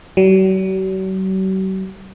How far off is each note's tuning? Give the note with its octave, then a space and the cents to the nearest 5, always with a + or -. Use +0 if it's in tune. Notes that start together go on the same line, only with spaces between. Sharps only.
F#3 +45